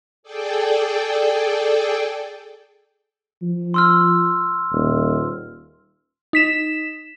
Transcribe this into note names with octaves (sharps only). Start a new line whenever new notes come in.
G#4 A4 D5 G5
F3
C6 E6 F6
D#1
D#4 B6 E7